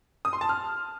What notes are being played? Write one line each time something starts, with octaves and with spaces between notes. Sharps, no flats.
D#6
C6
A5
F6